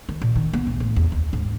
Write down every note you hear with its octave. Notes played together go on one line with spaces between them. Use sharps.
D#3
A#2
D#3
B3
A#1
A2
E2
D#2
G#2